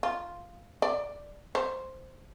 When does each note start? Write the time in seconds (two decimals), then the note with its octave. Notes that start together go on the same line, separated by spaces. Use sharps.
0.03 F4
0.82 D5
1.55 C5